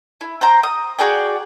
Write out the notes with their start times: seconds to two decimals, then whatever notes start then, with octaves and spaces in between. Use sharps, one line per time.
0.21 E4
0.41 C5 G5 A#5
0.63 D#6
0.99 F#4 G#4 D5 G5